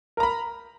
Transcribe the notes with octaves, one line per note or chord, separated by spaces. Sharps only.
A#4 A#5 B5